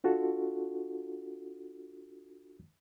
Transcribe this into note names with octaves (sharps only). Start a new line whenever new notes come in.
D4 F4 F#4 A4